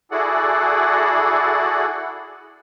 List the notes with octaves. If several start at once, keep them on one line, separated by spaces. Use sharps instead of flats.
E4 F#4 G#4 A4 D5 F#5